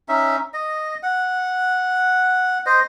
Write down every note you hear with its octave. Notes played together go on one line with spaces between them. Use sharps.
C#4 D#4 E5
D#5
F#5
C5 D#5